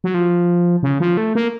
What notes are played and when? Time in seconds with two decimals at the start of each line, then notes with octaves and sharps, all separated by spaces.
0.04 F#3
0.14 F3
0.83 C#3
1.00 F3
1.17 A3
1.35 A#3